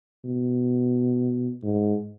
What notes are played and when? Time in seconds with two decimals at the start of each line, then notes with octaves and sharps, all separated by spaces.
0.24 B2
1.63 G#2